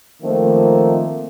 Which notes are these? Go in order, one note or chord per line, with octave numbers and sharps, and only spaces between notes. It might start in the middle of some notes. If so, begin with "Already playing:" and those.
D#3 F3 A3 A#3 C4